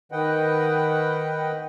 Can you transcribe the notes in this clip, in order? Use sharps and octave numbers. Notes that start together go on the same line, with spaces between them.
D#3 B4 D#5 F#5 G5